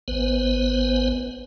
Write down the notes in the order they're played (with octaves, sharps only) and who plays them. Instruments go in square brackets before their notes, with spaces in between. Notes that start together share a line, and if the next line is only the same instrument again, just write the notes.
[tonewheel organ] G#1 B3 B4 C5